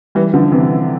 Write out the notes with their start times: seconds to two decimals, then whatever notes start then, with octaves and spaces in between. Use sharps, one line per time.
0.15 E3 G3
0.34 D3 F3
0.52 C3 E3